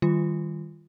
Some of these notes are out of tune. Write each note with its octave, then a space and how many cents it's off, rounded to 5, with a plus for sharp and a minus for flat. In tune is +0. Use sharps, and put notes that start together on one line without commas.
D#3 +0 G3 +0 F4 -10